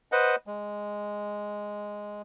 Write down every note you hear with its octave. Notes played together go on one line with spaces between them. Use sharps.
B4 C5 D#5 F#5
G#3